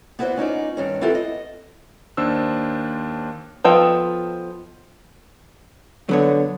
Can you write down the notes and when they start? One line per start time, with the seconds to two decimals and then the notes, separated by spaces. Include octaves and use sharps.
0.19 B3 E4 F#4 A#4 C5 D5
0.37 C#4 D#4 F4 D5
0.77 G2 D#3 C#4
1.01 B3 C4 E4 F4 G4 A4
1.15 D#5
2.17 D#2 D4 C5 E6
3.64 F3 B3 A4 D#5 G5
6.09 D3 F#3 B3 C#5